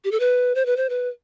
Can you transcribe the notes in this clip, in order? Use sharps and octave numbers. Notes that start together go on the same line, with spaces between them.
G4
A4
B4
C5
B4
C5
B4